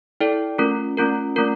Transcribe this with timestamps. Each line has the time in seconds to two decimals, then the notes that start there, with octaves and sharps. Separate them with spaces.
0.20 E4 A4 D5 G5
0.58 A3 C#4 F4 A#4
0.97 A3 C#4 F4 A#4
1.36 A3 C#4 F4 A#4